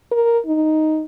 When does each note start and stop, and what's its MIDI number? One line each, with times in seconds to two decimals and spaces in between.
0.11 0.39 70
0.46 1.05 63